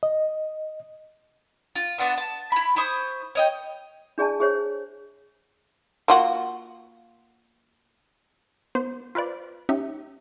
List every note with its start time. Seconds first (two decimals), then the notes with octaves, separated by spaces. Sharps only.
0.03 D#5
1.75 F4
1.98 B3 D4 F#5 C6
2.18 A5
2.52 E4 B5
2.76 E4 C5 C#6 D#6
3.35 C#5 D#5 G5
4.18 D4 G#4 D5 G#5 A5
4.40 G#4 C5 C#5
6.08 A#3 F4 F#4
8.75 B3 C5
9.15 F4 B4 C5 D5
9.69 C#4 D#4 G4 E5